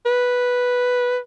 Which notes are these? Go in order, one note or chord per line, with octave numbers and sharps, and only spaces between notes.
B4